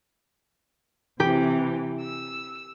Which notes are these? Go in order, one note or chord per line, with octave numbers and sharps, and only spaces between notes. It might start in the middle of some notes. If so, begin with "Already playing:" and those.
C3 E3 G4
E6